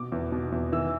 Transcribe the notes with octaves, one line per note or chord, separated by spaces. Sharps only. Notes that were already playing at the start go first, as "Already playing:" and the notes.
Already playing: B2 D6
E2
B2
E2
E3 E6